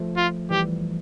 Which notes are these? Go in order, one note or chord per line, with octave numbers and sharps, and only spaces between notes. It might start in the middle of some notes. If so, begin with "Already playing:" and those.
Already playing: F3 A3
F4
E3 G3 G4